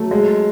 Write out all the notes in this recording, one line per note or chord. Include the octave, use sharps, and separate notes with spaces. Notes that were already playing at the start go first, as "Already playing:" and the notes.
Already playing: F#3 A3
G#3